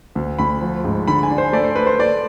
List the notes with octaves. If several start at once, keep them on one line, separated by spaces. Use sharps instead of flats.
D2
D2 B5
F3
G#2
D3 B5
G#5
D4
C5
A3 D5
C5
A3 B4
C5
A3 D5